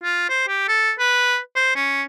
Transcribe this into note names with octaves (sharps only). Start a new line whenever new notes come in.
F4
C5
G4
A4
B4
C5
C#4